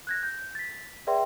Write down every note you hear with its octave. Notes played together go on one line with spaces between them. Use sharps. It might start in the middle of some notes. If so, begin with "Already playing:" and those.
F#6 G#6 A#6
G6
A6 B6
G#4 B4 D5 E5 G5 C6